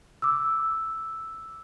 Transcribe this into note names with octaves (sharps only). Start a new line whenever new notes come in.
D6 E6